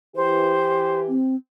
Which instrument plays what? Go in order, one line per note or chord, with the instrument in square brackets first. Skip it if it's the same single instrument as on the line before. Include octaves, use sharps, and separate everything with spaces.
[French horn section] E3 G4 [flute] C5
[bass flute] C4